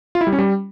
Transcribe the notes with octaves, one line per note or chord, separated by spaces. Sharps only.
F4
E4
G3
C#4
G3